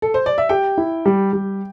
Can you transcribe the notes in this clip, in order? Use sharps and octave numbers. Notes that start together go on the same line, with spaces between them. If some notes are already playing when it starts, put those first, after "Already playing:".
A4
C5
D5
E5
G4 G5
E4
G3
G3